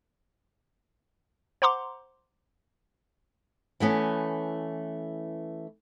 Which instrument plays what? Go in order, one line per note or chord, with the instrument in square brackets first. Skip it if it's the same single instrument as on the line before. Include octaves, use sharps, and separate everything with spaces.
[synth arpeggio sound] C5 F#5 A#5 C6 D6
[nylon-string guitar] E3 A3 B3 C#4